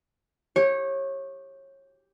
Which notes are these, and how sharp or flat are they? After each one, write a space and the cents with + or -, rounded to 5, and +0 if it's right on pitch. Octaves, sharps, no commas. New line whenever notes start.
G4 +0 C#5 -25